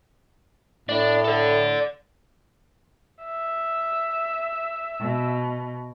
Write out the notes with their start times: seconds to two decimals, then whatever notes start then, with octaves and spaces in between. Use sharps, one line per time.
0.89 A2 D4
1.25 A4 D5
3.24 E5
5.00 B2